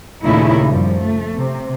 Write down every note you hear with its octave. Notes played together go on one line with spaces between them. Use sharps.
D#2 A#2 C#3 A3 D#4 E4
F#2 F3 G3
A3
C3